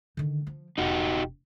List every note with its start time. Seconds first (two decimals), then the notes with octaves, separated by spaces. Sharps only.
0.17 D3 D#3
0.47 F3
0.78 E1 D#4 F#4 G4